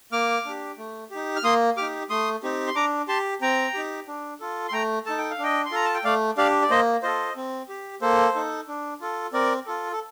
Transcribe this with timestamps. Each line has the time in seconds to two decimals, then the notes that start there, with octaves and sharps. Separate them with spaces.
0.12 A#3 D6 F6
0.45 D4 G4
0.78 A3
1.11 D#4 G4
1.36 F6
1.44 A#3 C6 D#6
1.77 D#4 G4 D6 F6
2.10 A3 C6 D#6
2.43 C4 D#4 G4
2.67 C6
2.75 D4 A#5 D6
3.08 G4 A5 C6
3.41 C4 G5 A#5
3.74 D#4 G4
4.08 D4
4.40 F4 A4
4.68 C6
4.72 A3 G5 A#5
5.06 D#4 A4 A5
5.18 G5
5.30 F5
5.39 D4 D#5 G5
5.65 C6
5.71 F4 A4 A#5
5.85 A5
5.94 G5
6.04 A3 D5 F5
6.37 D4 G4 D5 F5
6.62 D5
6.70 A#3 C5 D#5
7.03 F4 A4 C5 D#5
7.36 C4
7.69 G4
8.02 A#3 A4 C5
8.34 D#4 A4
8.68 D4
9.01 F4 A4
9.33 C4 A#4 D5
9.66 F4 A4
9.92 A4